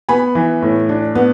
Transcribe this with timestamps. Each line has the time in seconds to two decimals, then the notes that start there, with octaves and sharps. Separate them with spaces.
0.09 B3 G#5 B5
0.35 E3
0.62 A2
0.89 D4
1.15 B3